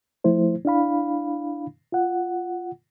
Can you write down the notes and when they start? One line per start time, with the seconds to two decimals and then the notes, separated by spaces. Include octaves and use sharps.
0.24 F3 A3 E4 C5
0.65 D4 E4 F5 B5
1.92 F4 F#5